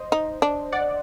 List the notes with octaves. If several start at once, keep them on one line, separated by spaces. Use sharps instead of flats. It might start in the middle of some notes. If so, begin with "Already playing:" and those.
Already playing: C5 D#5
D#4
D4
D5 F#5